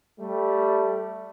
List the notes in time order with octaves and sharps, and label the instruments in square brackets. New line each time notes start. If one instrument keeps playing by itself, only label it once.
[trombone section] G3 A3